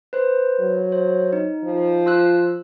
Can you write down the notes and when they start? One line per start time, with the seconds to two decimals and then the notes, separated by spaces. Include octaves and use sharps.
0.13 B4 C5
0.60 F#3
0.92 C5
1.33 D#4
1.64 F3
2.06 F4 E6 F#6